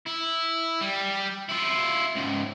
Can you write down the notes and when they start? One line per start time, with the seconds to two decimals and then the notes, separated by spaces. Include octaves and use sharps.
0.06 E4
0.81 G3
1.49 E4 F4
2.15 C#2 G#2